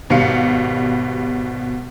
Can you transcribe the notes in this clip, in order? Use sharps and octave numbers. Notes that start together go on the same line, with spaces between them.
G#1 B2 G3 F5 C#7